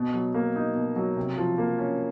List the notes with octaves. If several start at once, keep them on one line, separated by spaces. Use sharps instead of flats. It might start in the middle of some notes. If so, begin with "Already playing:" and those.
Already playing: B2
F#3
A#3
D#4
B2
F#3
C3
F3
A#3
C#4